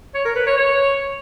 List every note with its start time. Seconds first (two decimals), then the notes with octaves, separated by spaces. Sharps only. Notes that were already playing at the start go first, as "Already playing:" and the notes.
0.14 C#5
0.25 A#4
0.36 B4
0.46 C#5
0.57 C#5